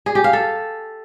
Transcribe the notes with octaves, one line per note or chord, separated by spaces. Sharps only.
G#4
G4
F5
A4